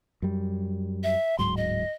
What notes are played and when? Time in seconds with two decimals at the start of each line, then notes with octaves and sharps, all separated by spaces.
0.22 F#2 G3
1.03 E5
1.39 D1 G#2 F#3 C6
1.57 D#5